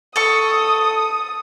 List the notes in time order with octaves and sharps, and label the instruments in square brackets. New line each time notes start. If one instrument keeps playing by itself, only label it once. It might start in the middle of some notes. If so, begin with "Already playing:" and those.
[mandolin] A4 C#6 [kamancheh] D#6